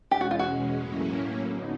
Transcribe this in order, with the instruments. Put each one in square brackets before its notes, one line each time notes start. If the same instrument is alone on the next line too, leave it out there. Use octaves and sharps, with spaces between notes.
[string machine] E2 B2 G#3 C#4 [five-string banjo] G4
[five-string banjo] F#4
F4
F#4
[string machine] A2 F#3 A#3 C#4 E4
D3 F#3 B3 D#4